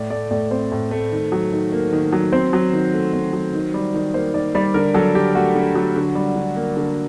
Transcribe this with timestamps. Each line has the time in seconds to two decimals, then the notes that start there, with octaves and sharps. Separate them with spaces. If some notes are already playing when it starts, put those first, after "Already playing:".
Already playing: A2 D5
0.10 A3 D5
0.31 A2 D5
0.51 C4 C5
0.72 A2
0.91 A3
1.12 D#3
1.32 F#3
1.52 D#3
1.72 A#3
1.93 D#3
2.13 F#3
2.32 C4 C5
2.53 F#3
2.73 D#3
2.93 A3
3.13 C4
3.33 F#3
3.53 D#3
3.74 G3
3.94 D#3
4.14 A#3 C5
4.34 D#3 D5
4.55 G3 D5
4.74 D3 A#4
4.94 F#3 A4
5.15 D3 G4
5.35 A3 F#4
5.55 D3
5.75 F#3
5.96 D3
6.15 G3
6.36 D3
6.56 A#3
6.77 D3